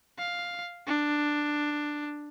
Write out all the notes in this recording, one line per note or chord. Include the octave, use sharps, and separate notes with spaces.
F5
D4